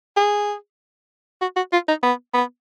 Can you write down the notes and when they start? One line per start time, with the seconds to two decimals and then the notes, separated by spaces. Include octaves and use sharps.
0.17 G#4
1.42 F#4
1.56 F#4
1.73 F4
1.88 D#4
2.03 B3
2.34 B3